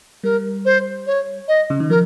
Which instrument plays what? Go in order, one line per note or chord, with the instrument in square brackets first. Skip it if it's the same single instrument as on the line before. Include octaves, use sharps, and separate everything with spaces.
[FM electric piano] G3 [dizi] A#4
[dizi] C5
C#5
D#5
[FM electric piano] C#3
D#3
[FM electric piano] F3 [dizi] A#4